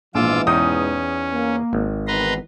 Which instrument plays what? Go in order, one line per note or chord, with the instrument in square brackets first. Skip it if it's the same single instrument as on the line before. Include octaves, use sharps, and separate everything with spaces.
[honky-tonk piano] A#1 [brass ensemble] G#2 B2 E3 [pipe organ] F4 D6 E6
[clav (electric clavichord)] E2 D#4 G5 [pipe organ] C#4 [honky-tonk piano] D#6
[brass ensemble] A#3
[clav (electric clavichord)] G#1
[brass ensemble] D#3 E3 B3 [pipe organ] B4 A#5 C6